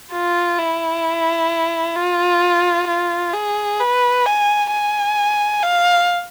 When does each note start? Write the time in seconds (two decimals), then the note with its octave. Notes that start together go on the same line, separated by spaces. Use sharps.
0.12 F4
0.58 E4
1.95 F4
2.87 F4
3.33 G#4
3.80 B4
4.26 G#5
4.71 G#5
5.63 F5